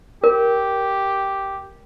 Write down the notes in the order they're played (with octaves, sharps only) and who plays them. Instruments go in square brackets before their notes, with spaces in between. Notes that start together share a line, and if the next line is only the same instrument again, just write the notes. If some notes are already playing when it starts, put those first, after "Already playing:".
[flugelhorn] G4 [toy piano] A#4